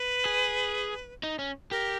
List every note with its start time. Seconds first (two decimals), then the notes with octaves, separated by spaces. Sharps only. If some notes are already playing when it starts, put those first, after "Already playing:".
Already playing: B4
0.25 G#4
1.23 D#4
1.39 C#4
1.71 G4 A#4